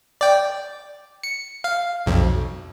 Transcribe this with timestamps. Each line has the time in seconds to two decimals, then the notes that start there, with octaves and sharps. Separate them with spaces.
0.21 D5 G5
1.23 C#7
1.64 F5
2.06 B1 F2